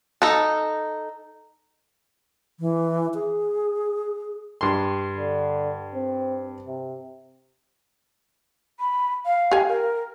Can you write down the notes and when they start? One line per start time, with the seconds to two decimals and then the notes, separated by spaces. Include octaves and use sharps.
0.22 D#4 A4
2.60 E3
3.14 G#4
4.61 G2 C6
5.17 D3
5.95 C4
6.67 C3
8.80 B5
9.25 F5
9.51 G4 G#5
9.69 A#4